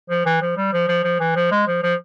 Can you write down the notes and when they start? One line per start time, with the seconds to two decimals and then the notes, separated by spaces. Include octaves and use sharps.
0.10 F3
0.26 E3
0.42 F3
0.57 G3
0.73 F3
0.88 F3
1.04 F3
1.20 E3
1.36 F3
1.51 G#3
1.67 F3
1.83 F3